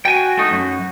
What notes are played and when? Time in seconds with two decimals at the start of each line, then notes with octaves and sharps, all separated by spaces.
0.05 F#4 G5 G#5
0.37 A3 D#4
0.51 F#2